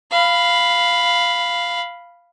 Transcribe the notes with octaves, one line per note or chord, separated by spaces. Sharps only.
F5 B5